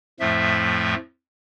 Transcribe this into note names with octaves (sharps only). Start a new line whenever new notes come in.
F2 A2 F3 A3 E5